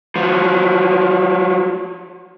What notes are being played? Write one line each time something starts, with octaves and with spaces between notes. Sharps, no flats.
F3 F#3